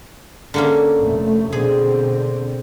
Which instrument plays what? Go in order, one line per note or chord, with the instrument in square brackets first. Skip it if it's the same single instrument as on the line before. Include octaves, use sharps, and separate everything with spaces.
[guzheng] D3 A#3 C#4
[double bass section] F1 A3
[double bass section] B2 D3 C4 [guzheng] G#4